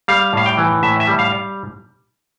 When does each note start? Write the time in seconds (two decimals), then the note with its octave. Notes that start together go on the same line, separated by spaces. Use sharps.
0.08 G3 F5
0.33 A2 F5
0.46 G5
0.57 E3
0.83 A2 E5
1.00 E5
1.07 G3
1.19 F5